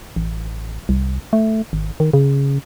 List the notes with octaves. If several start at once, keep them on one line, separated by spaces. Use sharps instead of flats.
A1
C2
A3
G#1
D#3
C#3